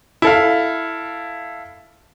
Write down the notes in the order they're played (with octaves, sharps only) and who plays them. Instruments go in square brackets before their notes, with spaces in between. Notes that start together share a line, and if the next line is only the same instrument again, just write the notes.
[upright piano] E4 A4 F5